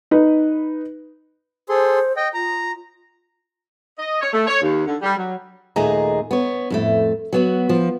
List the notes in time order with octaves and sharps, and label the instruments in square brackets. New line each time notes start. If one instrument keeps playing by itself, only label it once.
[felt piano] D#4 B4
[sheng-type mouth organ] G#4 A4 C6 [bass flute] C5
[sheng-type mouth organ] D#5 G5
[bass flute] F4 [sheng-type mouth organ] A#5
[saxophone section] D#5
C#5
A3
C#5
D#2
D3
G3
F#3
[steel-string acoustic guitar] D#2 A#2 A3 G#4 D#5 A#5
B3 C#5
F2 A2 A3
F#3 B3 F#4
F3